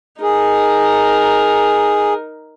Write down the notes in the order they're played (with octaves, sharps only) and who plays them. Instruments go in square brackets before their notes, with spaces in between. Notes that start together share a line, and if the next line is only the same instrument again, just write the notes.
[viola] D#4 A#4 [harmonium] G#4